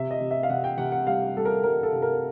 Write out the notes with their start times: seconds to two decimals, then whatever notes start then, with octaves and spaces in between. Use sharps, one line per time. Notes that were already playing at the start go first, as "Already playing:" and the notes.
Already playing: C3 E5
0.11 D#5
0.21 C3
0.31 E5
0.43 F5
0.49 C3 F#5
0.64 G5
0.78 C3 F#5
0.92 F#5
1.07 G3 F5
1.36 G3 A4
1.45 A#4
1.63 G3 A#4
1.83 A4
1.92 C3
2.02 A#4